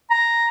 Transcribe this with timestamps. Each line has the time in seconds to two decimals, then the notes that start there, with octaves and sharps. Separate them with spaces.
0.10 A#5